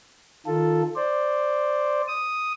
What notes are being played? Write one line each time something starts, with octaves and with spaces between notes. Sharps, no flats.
D#3 F4 A4
C5 D5
D#6